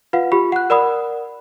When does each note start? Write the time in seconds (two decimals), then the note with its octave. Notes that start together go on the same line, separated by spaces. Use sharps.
0.13 F4 B4 F5 F#5
0.32 F4 G4 B5
0.52 F#5 F#6
0.70 A#4 D5 F#5 B5 D#6